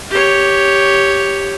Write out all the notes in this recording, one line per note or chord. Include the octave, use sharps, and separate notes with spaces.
G4 C#5